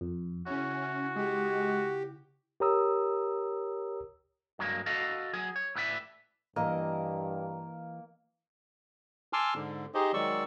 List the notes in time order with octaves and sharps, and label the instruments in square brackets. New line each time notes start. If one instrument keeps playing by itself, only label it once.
[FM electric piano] F2
[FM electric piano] C#3 E4 [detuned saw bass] C#4 [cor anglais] F#4
[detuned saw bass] G#3 [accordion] G4
[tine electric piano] G4 A#4 C#5 A#5 D#6 E6
[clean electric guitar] G2 F#3 G#3 A#3
F#4 A4 D#5 F5
F#3 G#4
C#5
A2 E4 B4 D5 E5
[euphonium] G2 [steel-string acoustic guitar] E3 D#5 [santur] A#3
[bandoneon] G#5 A5 C6 D6 E6 F6
G#2 D3
D#4 G4 G#4 C5 D#5
D#3 F#3 G#3 D5 C#6 E6